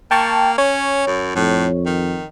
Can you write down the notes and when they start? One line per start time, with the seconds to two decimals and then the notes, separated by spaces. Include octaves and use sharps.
0.11 A#3 G5 A5 C#6
0.58 C#4 C#5
1.07 F#2
1.36 F2 A2
1.86 D#3